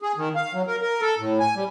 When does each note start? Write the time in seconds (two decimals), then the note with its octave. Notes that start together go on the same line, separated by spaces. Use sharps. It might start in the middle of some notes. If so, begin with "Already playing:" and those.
0.02 G#4
0.17 D#3
0.36 F5
0.53 F#3
0.67 A#4
0.81 A#4
1.01 A4
1.19 A2
1.40 G#5
1.55 G3